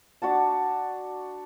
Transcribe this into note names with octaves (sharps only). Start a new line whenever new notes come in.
D4 F#4 F#5 A5